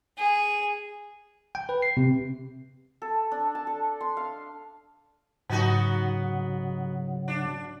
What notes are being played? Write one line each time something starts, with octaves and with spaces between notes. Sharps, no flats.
G#4
G5
B4
C7
C3
A4
D4
A5
A4
C6
F5
G#2 C#3 F#3 B3 D#4 F#4
D4